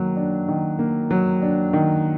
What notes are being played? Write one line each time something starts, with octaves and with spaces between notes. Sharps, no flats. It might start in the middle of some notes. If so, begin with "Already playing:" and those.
Already playing: D#3 F#3 A#3
D4
D#3
A#3
F#3
D4
D#3